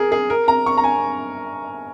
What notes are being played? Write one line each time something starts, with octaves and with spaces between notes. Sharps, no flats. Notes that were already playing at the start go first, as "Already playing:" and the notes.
Already playing: G#4 A#4
G#4
A#4
A#5
C#6
A#5
G#5